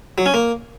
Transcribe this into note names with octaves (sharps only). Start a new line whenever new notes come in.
F#3
C#4
A#3